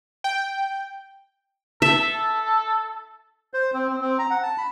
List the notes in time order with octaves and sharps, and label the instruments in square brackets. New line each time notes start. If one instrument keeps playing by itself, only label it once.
[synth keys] G5
[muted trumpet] A4 [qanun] E5
[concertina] C5
C4
C4
C4
A#5
F#5
A5
B5